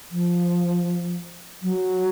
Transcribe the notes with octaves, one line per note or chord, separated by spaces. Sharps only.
F3
F#3